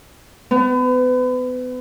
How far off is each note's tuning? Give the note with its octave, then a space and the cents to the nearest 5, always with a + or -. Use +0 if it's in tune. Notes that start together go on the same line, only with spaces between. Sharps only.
B3 +35